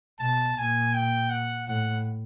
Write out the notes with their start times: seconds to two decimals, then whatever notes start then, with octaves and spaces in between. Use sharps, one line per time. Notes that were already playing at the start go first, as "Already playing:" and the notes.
0.20 B2 A5
0.57 A#2 G#5
0.94 G5
1.30 F#5
1.67 A2 F#5